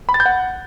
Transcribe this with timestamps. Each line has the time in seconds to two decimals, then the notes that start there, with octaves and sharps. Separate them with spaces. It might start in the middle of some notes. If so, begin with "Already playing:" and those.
0.09 B5
0.14 A6
0.20 G6
0.26 F#5